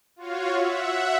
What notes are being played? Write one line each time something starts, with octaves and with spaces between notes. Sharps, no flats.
F4 F#4 C#5 F5
E5 F#5